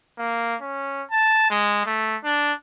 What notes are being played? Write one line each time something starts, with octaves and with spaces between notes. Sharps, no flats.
A#3
C#4
A5
G#3
A3
D4